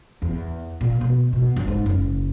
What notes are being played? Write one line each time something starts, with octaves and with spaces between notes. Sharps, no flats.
E2
A#2
B2
B2
G2
G#2
F#1